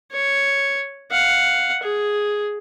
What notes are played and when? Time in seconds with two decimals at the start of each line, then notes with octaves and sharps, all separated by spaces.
0.12 C#5
1.11 F5 F#5
1.83 G#4